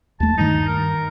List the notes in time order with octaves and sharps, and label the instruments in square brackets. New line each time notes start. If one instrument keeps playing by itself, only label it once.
[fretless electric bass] D#2 A3 [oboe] A5
[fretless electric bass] G2 D#3 [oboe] D#4
[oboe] A#4